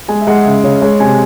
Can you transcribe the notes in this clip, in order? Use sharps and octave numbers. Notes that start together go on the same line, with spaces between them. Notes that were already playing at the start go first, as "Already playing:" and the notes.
G#3 G#5
E5
G#3 F#5
C#3 E5
C#3 C#5
G#3 C#5
C3 G#5